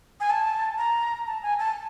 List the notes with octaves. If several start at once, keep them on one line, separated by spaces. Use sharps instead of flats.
G#5
A5
A#5
A5
G#5
A5